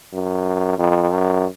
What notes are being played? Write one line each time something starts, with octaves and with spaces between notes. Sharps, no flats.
F#2
F2
F#2